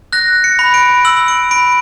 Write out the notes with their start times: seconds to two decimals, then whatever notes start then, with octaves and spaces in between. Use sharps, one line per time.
0.13 F#6 A#6
0.44 C#7
0.59 B5
0.74 D7
1.05 E6 F#7
1.28 D7
1.51 B5 D7